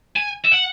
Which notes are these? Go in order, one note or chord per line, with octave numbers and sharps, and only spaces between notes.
G#5
E5
F#5